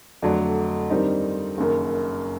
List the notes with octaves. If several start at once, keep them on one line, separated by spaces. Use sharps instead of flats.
F2 D3 F#3 A3 D4
G2 D#3 G3 C4 D#4
F#1 F#2 D#3